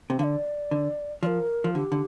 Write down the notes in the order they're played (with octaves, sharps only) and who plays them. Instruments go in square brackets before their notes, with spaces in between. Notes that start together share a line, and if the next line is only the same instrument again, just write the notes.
[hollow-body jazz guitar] C3
[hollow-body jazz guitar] D3 [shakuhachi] F5
[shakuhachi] D5
[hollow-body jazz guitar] D3
[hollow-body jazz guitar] F3 [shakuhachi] D5
[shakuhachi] A#4
[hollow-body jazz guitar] F3
[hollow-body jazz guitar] D3 [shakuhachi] G4
[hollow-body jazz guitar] D3